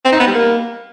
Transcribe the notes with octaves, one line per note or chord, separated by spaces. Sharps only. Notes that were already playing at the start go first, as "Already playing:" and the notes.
C4
D#4
B3
G3
A#3